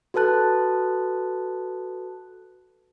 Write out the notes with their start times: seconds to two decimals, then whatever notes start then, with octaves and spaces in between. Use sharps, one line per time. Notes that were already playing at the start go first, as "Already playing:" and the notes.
0.14 F#4 A4 B4 A5 F#6